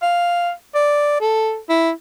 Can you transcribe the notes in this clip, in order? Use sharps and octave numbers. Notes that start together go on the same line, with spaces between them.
F5
D5
A4
E4